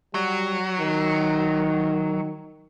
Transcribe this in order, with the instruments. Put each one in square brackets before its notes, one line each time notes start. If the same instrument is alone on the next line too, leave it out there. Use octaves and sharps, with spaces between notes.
[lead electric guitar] F#3 [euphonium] G3
[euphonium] D#3